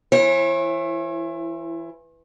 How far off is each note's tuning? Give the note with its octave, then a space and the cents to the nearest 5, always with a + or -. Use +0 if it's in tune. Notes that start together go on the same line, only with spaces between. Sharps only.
E3 +5 E4 +25 C#5 -45